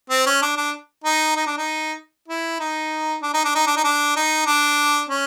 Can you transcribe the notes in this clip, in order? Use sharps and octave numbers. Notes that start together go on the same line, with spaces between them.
C4
C#4
D4
D4
D#4
D#4
D4
D#4
E4
D#4
D4
D#4
D4
D#4
D4
D#4
D4
D#4
D4
C#4